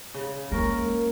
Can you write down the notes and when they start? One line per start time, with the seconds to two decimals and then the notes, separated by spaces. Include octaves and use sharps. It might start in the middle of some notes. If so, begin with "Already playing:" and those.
0.14 C#3
0.52 G#3 A#3 C#4 A#4